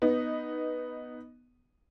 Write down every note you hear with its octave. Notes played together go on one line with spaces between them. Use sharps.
B3 D#4